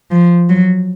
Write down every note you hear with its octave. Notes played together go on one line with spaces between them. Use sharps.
F3
F#3